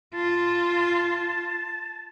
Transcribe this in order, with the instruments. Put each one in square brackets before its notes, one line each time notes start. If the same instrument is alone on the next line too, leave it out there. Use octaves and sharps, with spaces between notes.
[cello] F4 [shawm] A5